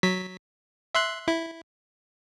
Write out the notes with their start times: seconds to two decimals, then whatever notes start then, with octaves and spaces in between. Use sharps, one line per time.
0.03 F#3 B6
0.95 E5 C6 F#6
1.28 E4